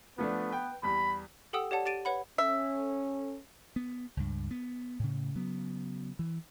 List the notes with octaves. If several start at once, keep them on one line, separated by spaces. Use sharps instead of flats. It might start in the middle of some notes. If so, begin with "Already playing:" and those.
F3 A3 B3 D4
B4 G5
E2 G3 B5
G4 A4 F#5 G5 D#6 E6
G4 C#5 D5 F#5 A5
G4 A6 D7 D#7
B4 C#5 F#5 B5
C#4 A4 E5
B3
C#2 G2
B3
A2 C#3
C#3 F#3 B3
E3